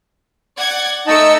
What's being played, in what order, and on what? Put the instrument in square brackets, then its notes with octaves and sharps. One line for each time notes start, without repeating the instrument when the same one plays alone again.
[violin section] D5 F#5 G#6
[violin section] A3 E6 C#7 [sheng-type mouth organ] D#4 D#5 A5